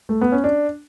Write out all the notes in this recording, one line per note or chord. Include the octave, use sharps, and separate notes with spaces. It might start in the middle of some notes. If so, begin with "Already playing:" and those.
A3
B3
C#4
D4